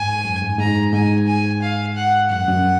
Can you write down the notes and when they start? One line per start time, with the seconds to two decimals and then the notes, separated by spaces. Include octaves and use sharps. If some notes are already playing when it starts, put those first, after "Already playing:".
Already playing: G#2 G#5
0.25 F#2
0.42 G#2
0.59 G#2 A#5
0.93 G#2 G#5
1.27 G#5
1.62 F5
1.96 F#5
2.30 F#2 F#5
2.48 F#2